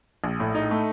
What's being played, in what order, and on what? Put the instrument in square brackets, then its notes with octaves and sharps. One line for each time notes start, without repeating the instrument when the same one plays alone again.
[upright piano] A#1
A2
D#4
A3